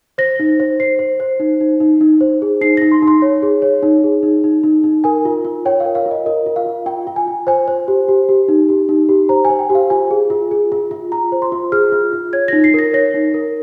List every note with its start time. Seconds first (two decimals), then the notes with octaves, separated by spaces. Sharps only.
0.18 C5 A#6
0.40 D#4
0.60 C5
0.80 C5 C7
0.99 C5
1.20 C5
1.40 D#4
1.61 D#4
1.80 D#4
2.01 D#4
2.21 C5
2.42 G#4
2.61 D#4 C7
2.77 D#4 A#6
2.92 C6
3.02 D#4
3.07 C6
3.22 C#5
3.42 G#4
3.62 C#5
3.83 D#4
4.04 G#4
4.23 D#4
4.44 D#4
4.63 D#4
4.84 D#4
5.04 A#4 G#5
5.25 F4
5.45 F4
5.65 C#5 G5
5.80 F5
5.85 A#4
5.95 F5
6.06 F4
6.11 D#5
6.26 A#4 D#5
6.46 F4
6.56 F5
6.66 F4
6.86 F4 G5
7.07 F4
7.16 G#5
7.27 F4
7.47 C5 G#5
7.68 C5
7.88 G4
8.08 G4
8.29 G4
8.49 D#4
8.69 G4
8.89 D#4
9.09 G4
9.29 C5 A#5
9.45 C5 G#5
9.59 G5
9.70 G4
9.75 F5
9.90 F4 G#5
10.11 G#4
10.30 F4
10.51 G#4
10.72 F4
10.91 F4
11.12 F4 A#5
11.32 C5
11.42 C6
11.52 F4
11.72 G#4 F6
11.92 F4
12.13 F4
12.33 C#5 G#6
12.48 D#4 A#6
12.64 C7
12.74 A#4 A#6
12.94 C#5 A#6
13.14 D#4
13.34 A#4